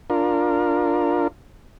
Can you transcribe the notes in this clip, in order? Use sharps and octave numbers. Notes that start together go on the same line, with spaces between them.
D4 F4 A#4